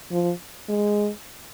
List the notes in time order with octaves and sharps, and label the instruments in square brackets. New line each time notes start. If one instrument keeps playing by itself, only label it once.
[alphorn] F3
G#3